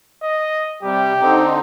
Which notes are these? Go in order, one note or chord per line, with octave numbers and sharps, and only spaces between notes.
D#5
C3 G3 G4
D3 C4 D#4